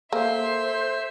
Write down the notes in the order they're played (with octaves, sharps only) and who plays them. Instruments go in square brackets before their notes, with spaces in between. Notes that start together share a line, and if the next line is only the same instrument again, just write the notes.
[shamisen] A#3 [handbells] A4 [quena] C5 [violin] E5 C6